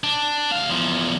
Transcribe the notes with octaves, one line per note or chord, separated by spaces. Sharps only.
D4
D2 F5
E2 F3